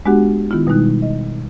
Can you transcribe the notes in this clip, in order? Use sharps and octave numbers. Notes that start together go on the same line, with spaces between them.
G#3 B3 D4 F#4 G4 F#5
D#3 B3 E4 F4
B2 G3 G#3 D#4 F#6
D#5